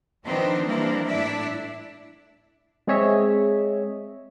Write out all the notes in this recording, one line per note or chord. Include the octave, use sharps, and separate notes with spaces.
D#3 F3 B3 C4 D4 D#4
E3 G3 A#3 C4 D4 A#4
A2 D4 E4 D5 E5
G#3 C4 G#4 C#5 D#5 E5